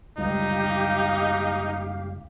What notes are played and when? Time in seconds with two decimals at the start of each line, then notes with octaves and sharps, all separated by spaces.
0.18 F#1 C#2 G3 D#4 G4 F5